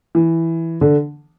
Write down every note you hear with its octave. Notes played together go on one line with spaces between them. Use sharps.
E3
D3